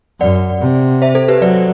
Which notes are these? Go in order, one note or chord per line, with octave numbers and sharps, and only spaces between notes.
F#2 D5 F#5
C3
C5 E5
A4 C5
G4 B4
F#3 B4 D5